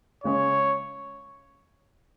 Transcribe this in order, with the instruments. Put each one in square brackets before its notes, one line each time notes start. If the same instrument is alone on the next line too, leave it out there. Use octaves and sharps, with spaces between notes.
[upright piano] C#3 G#3 C#4 G#4 [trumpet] C#5